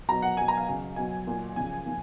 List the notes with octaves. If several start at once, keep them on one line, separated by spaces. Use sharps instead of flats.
B2 F#3 A#5
F#5
B2 F#3 G#5
A#5
F5
C#3 F#3
B2 F#3 G#5
A#2 F#3
C#3 F3 G#5
A#2 F3